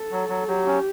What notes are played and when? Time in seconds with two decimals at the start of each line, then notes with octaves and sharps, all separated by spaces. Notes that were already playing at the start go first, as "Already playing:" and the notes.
Already playing: A4
0.12 F#3
0.29 F#3
0.48 F#3 G4
0.66 C#4